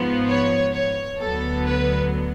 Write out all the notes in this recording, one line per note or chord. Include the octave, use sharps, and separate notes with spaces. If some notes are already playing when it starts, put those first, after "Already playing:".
Already playing: G#2 F3 B3
C#5
C#5
D2 D3 F#3 B3 A4
B4